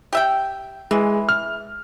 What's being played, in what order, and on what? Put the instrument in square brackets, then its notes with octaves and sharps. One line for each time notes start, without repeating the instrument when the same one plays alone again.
[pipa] G4 E5 G5
[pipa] E3 [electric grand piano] G#3
[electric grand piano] F6